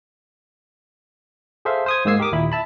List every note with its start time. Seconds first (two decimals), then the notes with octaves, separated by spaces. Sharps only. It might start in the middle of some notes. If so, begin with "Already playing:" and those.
1.65 G#4 A4 C5 E5 F5
1.86 C5 D#6 G#6
2.05 G#2 G#3 A#3 E6 G#6 C7
2.20 G4 A#4 D6 D#6
2.32 D#2 A#2 E4 B5
2.52 E5 A5 B5